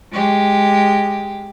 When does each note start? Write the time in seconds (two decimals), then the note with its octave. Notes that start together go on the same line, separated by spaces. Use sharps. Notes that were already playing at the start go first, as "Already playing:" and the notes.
0.12 G#3 G4